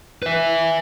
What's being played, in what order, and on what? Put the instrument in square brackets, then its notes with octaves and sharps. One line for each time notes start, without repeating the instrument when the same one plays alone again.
[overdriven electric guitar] B4 E5